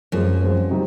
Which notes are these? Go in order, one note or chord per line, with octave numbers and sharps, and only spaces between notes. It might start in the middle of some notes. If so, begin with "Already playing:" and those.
F#2 F3 G#3 C4
F3 G#3 C4
C3 F#3 C4 D#4